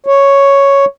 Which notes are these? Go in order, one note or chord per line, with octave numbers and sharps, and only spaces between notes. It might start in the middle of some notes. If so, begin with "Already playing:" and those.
C#5